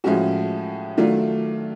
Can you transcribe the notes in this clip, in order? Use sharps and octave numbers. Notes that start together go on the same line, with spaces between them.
A2 F3 G#3 C#4 F#4
D#3 F#3 A3 D4 F4